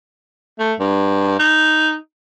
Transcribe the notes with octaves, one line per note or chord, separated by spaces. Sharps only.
A3
G2
D#4